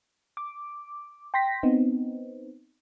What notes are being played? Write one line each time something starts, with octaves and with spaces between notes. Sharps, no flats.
D6
G5 C6 A#6 B6
B3 C4 D#4